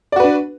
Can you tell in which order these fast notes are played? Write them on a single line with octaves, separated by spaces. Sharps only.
D5 F#4 B4 D4